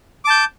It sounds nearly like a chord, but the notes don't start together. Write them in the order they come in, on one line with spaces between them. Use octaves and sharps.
D6 A5 G6